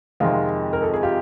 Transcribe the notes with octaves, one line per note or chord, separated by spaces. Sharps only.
F2 C3 D#3 G#3 F4
A#4
A4
G#4
F4 G4